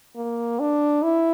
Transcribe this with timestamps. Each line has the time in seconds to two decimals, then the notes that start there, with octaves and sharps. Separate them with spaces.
0.16 A#3
0.60 D4
1.03 E4